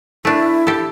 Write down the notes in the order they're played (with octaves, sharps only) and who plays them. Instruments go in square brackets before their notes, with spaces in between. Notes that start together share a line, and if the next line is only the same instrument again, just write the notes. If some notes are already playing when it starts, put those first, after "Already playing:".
[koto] A3 D4 [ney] E4
[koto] G4 A4